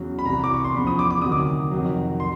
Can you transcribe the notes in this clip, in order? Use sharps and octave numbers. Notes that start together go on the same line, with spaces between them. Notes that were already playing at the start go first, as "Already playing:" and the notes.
Already playing: E2 C#3 F#3
B5
C2 C3 E3 G3 A#5
D6
C#6
C6
E2 C#3 F3 B5
D#6
D6
D6
D2 C3 D#3 F#3 D#6
D6
F2 C3 D#3 F#3
C6